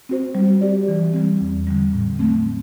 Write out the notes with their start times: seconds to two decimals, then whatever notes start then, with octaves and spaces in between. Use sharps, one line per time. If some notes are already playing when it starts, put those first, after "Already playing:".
0.09 C4 F#4 C5
0.35 G3
0.61 C4 G4 D5
0.88 E3
1.14 G3 C4
1.41 E2
1.67 D3 G3
1.93 A2
2.19 F#3 A3 C4